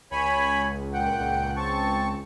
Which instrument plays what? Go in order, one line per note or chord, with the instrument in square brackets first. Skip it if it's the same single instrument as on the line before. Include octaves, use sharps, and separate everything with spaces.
[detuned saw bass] C#2 [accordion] C#5 G#5 B5
[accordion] A#2 F#5 G5
[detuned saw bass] C#2
[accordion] C4 A5 C#6